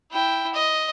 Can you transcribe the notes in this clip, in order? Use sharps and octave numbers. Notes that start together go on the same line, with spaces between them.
E4 G5
D#5